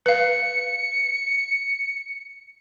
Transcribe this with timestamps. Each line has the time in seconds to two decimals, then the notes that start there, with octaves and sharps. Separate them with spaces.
0.06 B4 F5 C#7